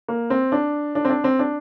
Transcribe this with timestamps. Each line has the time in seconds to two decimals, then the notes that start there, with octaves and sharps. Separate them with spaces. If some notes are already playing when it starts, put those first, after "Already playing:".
0.08 A#3
0.30 C4
0.52 D4
0.95 D4
1.05 C4
1.10 D4
1.24 C4
1.39 D4